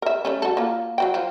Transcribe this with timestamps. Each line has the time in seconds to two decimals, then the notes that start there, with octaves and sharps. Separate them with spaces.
0.02 A#4 E5
0.25 G3 A3 C#4
0.42 F#4 A4
0.57 A#3 F4
0.98 F#3 F#4 G5
1.14 F3